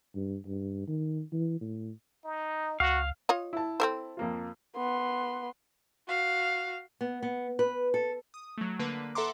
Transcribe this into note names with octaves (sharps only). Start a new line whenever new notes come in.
G2
G2
D#3
E3
A2
D#4
C#2 F#4 F5
F4 C#5 D#5
E4 A5
C4 A4 C5
F2 A#3 F4
B3 C6
F#4 F5
B3
B3
B4
A4
D#6
F#3 A3
D3 A#3 B4
A4 E5 F#5 A#5 C6 D6